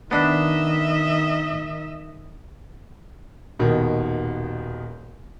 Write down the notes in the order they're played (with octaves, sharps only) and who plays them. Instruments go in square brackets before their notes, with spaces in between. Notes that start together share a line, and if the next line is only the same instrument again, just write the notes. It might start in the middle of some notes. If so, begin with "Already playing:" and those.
[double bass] D#3 [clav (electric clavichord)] B3 D4 [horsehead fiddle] D#5 E5
[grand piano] D#1 B2 D#3